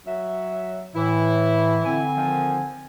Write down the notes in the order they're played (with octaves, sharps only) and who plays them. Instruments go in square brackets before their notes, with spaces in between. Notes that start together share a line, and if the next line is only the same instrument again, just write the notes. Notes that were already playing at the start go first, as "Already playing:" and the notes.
[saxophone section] F#3 E5
[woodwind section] A2 E3 [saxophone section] E4
[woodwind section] D3 C4 G#5
[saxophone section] D#3 F3